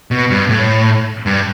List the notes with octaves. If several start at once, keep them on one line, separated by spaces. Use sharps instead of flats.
B2
G2
A2
G2